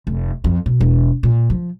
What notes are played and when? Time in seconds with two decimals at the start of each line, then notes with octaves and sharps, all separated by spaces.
0.07 F1
0.44 F2
0.66 B2
0.81 E1
1.23 A#2
1.50 F3